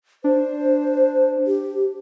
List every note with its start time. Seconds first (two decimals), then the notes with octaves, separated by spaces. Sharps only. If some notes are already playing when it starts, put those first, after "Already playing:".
0.24 D4 C5
1.47 G4